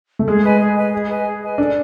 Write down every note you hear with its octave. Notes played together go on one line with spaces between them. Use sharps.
A3
G#3 G#4
B4 D#5 G#5
G#4
B4 D#5 G#5
G#4
B4 D#5 G#5
G#4
B4 D#5 G#5
D4 A4